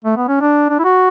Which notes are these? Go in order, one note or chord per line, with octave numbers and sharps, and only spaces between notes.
A3
B3
C#4
D4
D4
E4
F#4